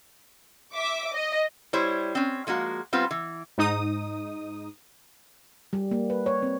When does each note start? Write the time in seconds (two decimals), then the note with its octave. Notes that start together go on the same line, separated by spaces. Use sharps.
0.73 E5 D6
1.13 D#5
1.73 G3 E4 C5 C#5
2.15 C4 C#4
2.47 F3 G#3 A#3 F#4
2.93 G3 B3 C4 F4
3.11 E3
3.58 G#2 D#4 D#6
5.73 G3
5.91 A#3
6.10 B4
6.26 C#5
6.42 C4